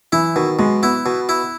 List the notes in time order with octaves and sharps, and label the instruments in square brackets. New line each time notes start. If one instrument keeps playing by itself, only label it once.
[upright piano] E3 [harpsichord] E4
[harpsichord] B2 [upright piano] D#3
[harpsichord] B2 [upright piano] G#3
[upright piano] B3 [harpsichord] E4
[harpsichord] B2
E4